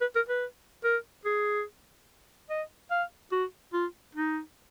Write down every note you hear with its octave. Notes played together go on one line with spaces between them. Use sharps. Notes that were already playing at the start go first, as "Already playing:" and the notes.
B4
A#4
B4
A#4
G#4
D#5
F5
F#4
F4
D#4